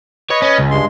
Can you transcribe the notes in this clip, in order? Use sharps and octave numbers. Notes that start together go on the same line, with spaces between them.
B4 C#5 D#5
C#4
C#2
G2 G#3 C6